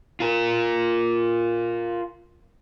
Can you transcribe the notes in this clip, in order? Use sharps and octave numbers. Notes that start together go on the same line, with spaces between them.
F4 A#4